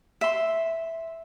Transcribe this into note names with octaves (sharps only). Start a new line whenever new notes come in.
E5 C6